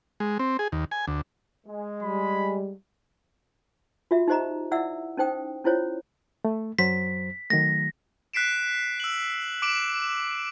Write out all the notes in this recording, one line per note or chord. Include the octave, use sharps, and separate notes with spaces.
G#3
C4
G#4
D#2
G#5
D2
G#3
G3 B5
F4 F#4 E5
D#4 G4 C5 D#5 A#5
E4 D5 E5 F#5 E6
C#4 D#4 C5 G5 D#6
C#4 E4 F4 C5 C#5
A3
F#2 F#3 C5 B6
D#3 F#3 A3 A#6
F#6 B6 C7 D7 E7
E6 F#7
D6 D7 E7 F#7